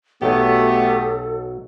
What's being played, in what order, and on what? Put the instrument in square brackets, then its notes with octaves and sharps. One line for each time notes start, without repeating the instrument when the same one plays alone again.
[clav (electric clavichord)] B1 F#3 [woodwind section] A3 B3 [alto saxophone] G4 [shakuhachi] A4